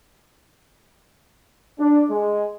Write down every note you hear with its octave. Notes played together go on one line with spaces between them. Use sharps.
D4
G#3